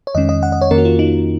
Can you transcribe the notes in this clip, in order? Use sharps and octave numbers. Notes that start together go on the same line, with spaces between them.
C#5
F2 D#3 G#3 C#4 D#5
D#5
F#5
D#5
C#5
F2 D#3 A#3 C#4 A#4
F#4
F4
D#4